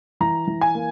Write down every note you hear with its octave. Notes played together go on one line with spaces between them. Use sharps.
E3 A#5
E3
G#5
A#3